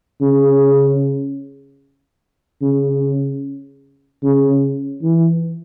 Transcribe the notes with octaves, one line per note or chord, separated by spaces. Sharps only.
C#3
C#3
C#3
E3